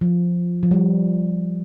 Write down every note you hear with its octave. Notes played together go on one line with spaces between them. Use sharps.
F3
F3
G3